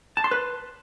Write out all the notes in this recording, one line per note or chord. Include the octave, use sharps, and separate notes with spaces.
A5
C6
B4